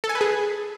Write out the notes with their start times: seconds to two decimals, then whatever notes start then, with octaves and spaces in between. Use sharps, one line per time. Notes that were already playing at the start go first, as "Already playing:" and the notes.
0.04 A4
0.09 G#5
0.15 B4
0.21 G#4